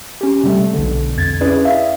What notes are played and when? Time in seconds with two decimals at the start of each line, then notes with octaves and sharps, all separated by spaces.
0.21 C#4 G4
0.43 C3 G3 A3
0.74 B1 D3
1.17 F2 G#6 A6
1.41 C#4 E4 G#4 B4 D5
1.65 E5 F5